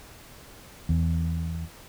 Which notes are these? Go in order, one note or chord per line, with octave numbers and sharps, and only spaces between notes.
E2